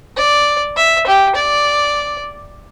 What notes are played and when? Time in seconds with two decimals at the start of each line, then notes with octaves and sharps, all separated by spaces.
0.17 D5
0.77 E5
1.07 G4
1.36 D5